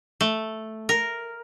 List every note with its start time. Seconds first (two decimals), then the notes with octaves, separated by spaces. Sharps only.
0.21 A3
0.89 A#4